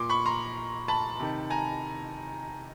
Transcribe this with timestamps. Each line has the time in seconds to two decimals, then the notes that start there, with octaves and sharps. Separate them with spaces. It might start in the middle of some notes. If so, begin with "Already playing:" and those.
Already playing: A#2 C6 D6
0.09 B5 C#6
0.26 A#5 C6
0.88 A5 B5
1.20 C3 D#3
1.50 G#5 A#5